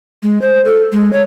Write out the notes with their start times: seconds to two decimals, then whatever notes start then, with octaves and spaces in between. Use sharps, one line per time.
0.23 G#3
0.42 C5
0.65 A4
0.92 G#3
1.13 C#5